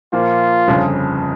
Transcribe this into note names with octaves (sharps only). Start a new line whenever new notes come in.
A#2 F3 A#3 F4
G1 F2 C#3